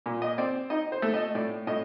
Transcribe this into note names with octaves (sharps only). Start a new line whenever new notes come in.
A#2
D#5
C4 D5
D#4 D#5
C5
A3
D#5
A2 D5
A2 D#5